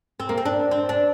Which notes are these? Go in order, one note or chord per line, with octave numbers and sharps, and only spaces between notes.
C4
A#3
C4
D4
C4
D4